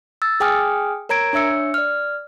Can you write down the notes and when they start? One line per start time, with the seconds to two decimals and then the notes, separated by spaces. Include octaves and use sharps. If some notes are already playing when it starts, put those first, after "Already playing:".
0.22 E6 A6
0.40 G#4 G5 G#5 D#6 F6
1.09 A#4 C#5 A#5 G#6 D7
1.33 D4 C#5 E5 E6 C#7
1.74 D5 F6